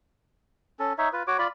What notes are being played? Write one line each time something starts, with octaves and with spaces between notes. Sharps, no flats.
C#4 A4
D#4 C#5 E5
F4 B4
F#4 C#5 D6
F4 D5 B5